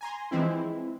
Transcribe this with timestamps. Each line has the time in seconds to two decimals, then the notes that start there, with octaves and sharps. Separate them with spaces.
0.01 G#5 A#5 C6
0.31 E3 F3 G#3 C4 E4